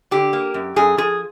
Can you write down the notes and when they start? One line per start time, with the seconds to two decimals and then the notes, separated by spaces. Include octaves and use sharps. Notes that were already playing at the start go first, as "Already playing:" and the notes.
0.11 D3 G4
0.33 A#3
0.54 F#2
0.76 F#2 G#4
0.97 F3 G#4